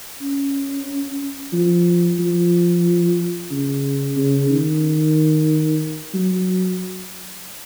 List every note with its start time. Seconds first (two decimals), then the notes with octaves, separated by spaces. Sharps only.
0.22 C#4
1.53 F3
2.19 F3
3.51 C#3
4.17 C#3
4.50 D#3
6.14 F#3